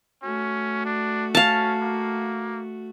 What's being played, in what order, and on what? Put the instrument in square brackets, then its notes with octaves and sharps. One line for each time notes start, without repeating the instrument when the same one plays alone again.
[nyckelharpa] A3 F#4 [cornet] C#4
[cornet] D4
[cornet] C#4 [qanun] F5 A5
[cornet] A#3